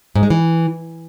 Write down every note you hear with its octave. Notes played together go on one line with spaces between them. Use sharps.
G#2
G#3
E3